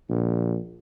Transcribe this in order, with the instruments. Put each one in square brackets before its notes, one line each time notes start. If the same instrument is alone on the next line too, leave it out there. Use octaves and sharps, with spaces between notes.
[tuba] A#1